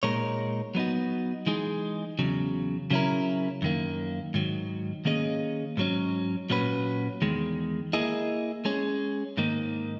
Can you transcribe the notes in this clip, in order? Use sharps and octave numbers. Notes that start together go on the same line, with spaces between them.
A#2 G#3 D#4 A#4 C#5
F#3 B3 D#4 F#4
E3 G#3 D#4 G#4
E2 C#3 F#3
C#3 F#3 C#4 E4 A#4
F#2 D#3 A#3
G#2 D#3 F#3
D#3 A#3 C#4 G#4 D#5
G#2 F#3 C#4
A#2 F#3 C#4 F#4 B4
E2 D#3 G#3
A#3 E4 G#4 D#5
G#3 C#4 G#4
G#2 D#3 A#3 D#4